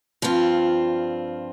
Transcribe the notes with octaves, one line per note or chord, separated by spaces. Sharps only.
G2 F3 C4 F4